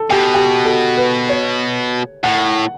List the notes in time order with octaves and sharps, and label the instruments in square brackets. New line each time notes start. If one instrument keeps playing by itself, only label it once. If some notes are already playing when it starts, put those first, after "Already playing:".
Already playing: [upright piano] A4
[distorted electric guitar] B2 [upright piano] G4
[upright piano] G4
A4
B4
C#5
[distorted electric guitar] A2 [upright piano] F#5